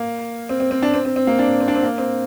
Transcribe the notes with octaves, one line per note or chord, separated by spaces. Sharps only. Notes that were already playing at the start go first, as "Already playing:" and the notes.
Already playing: A#3
C4
C4
C4
D4
C4
C4
C4
A#3
D4
C4
D4
C4
A#3
C4